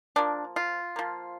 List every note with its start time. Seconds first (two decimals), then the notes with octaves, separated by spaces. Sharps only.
0.16 F3 A#3 D4
0.56 F4
0.96 F3 A#3